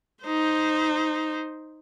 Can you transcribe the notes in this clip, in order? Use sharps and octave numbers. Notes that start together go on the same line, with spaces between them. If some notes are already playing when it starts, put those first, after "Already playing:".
D#4 C5